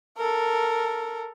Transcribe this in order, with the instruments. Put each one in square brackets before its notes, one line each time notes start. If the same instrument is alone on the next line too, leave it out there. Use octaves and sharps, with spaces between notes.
[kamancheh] A4 A#4